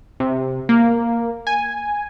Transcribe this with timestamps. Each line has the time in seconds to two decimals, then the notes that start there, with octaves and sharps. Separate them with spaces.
0.20 C3
0.69 A#3
1.47 G#5